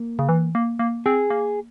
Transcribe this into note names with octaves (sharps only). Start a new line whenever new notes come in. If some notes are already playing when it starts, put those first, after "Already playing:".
Already playing: A#3
C#3
E3
A#3
A#3
C4 G#4
A#3